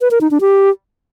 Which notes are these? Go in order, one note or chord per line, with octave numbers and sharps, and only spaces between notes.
B4
A#4
D#4
D4
G4